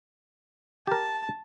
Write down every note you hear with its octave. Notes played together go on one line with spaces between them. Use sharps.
G4 A#4 A5